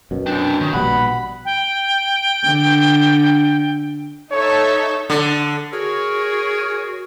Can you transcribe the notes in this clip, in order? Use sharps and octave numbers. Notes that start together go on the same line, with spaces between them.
F#2 B2
C4 D4 G5
D#3
A#1 B2 G3 F#5 B5
G5
D3
D#4 A4 C#5 E5
D3
F#4 G#4 A#4 C#5